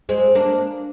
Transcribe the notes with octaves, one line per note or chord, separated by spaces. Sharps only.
G#3 C4
A#3 D4